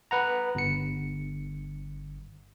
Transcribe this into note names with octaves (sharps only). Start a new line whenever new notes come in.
B4 F#5 A#5
G1 C#7